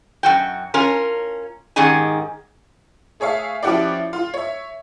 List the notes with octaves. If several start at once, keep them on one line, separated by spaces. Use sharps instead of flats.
F#2 F#4 G5
C#4 F4 A#4
G#2 D#3 C#4 G4 G#4 G#5
A3 G#4 C#5 E5 F5
F3 C#4 E4 F#4 G4 D5
F4
C#5 E5